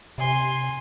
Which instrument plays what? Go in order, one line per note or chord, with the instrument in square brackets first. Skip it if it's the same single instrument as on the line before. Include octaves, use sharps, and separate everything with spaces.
[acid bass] C3 [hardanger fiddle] G#5 C6